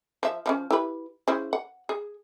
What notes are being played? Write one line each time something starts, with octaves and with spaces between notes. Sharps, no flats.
F3 E5
F3 A#3 C#4
E4 G4 B4
C#3 E4 C5
F#5
G#4